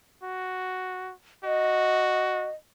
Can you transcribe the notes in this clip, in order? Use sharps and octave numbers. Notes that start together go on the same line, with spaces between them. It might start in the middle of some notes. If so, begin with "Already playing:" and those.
F#4
F#4 D#5